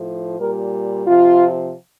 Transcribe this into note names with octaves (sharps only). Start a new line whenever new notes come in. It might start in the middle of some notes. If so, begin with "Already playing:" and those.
Already playing: A2 F3
A#2 G3 A#4
C3 F3 F4